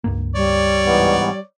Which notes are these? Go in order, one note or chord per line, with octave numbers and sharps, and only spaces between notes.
C#2 G2 A#3
G3 C#5 D5
G#2 E3 B3